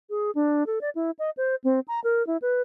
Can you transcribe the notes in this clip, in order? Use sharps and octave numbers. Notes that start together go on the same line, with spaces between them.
G#4
D4
A4
D5
E4
D#5
C5
C4
A#5
A#4
E4
B4